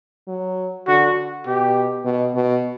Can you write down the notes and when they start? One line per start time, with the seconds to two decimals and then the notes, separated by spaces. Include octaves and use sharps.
0.28 F#3
0.87 D3 F#4
1.47 B2 G4
2.05 B2
2.35 B2